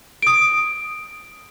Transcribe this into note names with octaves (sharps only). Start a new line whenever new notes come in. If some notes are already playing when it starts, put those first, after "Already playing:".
D#6 D7